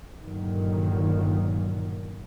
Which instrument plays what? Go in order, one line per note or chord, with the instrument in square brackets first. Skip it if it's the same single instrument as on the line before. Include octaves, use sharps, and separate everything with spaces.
[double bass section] G1 A#2 D#3 F#3